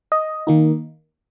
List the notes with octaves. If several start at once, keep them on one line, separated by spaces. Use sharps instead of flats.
D#5
D#3 A#3 D#4